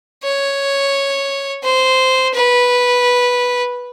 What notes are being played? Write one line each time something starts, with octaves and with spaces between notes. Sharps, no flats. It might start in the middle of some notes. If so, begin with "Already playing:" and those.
C#5
C5
B4